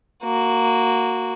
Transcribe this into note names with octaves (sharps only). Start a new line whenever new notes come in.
A#3 F#4